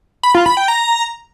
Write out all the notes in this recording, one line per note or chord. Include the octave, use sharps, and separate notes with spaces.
B5
F4
B5
G5
A#5